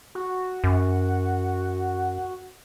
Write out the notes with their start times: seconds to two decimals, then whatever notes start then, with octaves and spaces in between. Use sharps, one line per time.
0.15 F#4
0.64 F#2